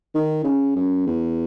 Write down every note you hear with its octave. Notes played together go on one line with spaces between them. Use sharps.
D#3
C#3
F#2
E2